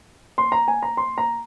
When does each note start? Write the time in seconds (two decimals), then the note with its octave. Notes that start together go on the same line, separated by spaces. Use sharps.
0.38 C6
0.52 A#5
0.68 G#5
0.83 A#5
0.97 C6
1.18 A#5